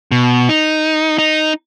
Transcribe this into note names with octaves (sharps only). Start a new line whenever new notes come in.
B2
D#4
D#4